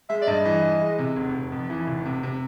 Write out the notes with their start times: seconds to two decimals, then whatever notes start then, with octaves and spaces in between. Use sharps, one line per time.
0.09 G#3 E5
0.22 D5
0.27 G2 D#5
0.45 E3
0.64 E3
0.81 G#3
0.99 C3
1.16 F1
1.34 F1
1.52 F2
1.70 E3
1.87 F1
2.05 C3
2.23 C3